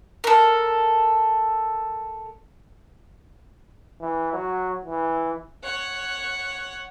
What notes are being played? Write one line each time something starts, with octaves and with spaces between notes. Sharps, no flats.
A4 A#4
E3
F#3
E3
C#5 F#5